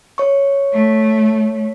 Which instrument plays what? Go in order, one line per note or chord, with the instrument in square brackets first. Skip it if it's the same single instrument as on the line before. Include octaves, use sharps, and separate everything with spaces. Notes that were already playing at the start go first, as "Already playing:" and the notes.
[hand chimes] C#5 C#6
[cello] A3